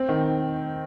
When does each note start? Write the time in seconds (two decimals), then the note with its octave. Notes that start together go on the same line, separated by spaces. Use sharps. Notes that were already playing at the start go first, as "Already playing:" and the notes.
Already playing: C4
0.09 D#3